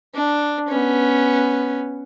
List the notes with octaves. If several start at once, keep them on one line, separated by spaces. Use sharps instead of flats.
D4
B3 C#4